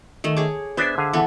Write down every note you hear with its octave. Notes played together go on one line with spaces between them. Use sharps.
D#3 A3
G#4 C#5 D6
B3 D4 C5 E5 G#5
D3 G#4 F5
E3 B3 A4